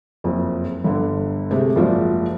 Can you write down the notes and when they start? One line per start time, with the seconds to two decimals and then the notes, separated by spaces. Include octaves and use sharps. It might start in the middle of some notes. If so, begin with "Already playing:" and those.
0.24 F#1 F2
0.84 G1 D3
1.51 C3 G#3 A3
1.75 F#1 G#2 F3 F4 F#4 D5